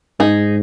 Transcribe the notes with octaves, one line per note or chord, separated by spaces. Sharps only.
G#2 D#4 G#4